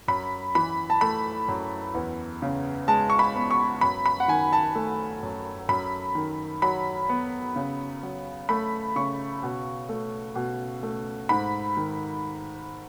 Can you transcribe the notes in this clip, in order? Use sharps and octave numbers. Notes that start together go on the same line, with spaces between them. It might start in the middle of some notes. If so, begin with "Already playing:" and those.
F#2 B5
E3 B5
A5
A3 B5
F#2
E2
C#3
G#3 A5
C#6
B5
B3
C#6
F#2 B5
B5
F#5
D#3 G#5
A5
A3
F#2
F#2 B5
D#3
F#3 B5
B3
C#3
F#3
A3 B5
C#3 C#6
B2
A3
B2
A3
G#2 B5
D#3